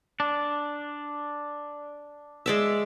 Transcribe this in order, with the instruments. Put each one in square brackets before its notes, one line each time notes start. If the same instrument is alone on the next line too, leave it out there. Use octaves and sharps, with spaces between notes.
[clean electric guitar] D4
[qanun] G#3 D5 E5